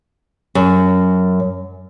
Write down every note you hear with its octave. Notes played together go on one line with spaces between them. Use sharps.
F#2